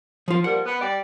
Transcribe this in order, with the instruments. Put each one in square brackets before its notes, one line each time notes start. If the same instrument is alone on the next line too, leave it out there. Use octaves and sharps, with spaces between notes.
[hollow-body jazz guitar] F3 F4
[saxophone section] F3 G3 A#3 [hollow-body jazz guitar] F#5
[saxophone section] B3
G3 D5